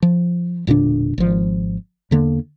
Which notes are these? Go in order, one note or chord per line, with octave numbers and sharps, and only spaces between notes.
F3
E1 A#2 D3 D4
G#1 F3
E2 D3 A#3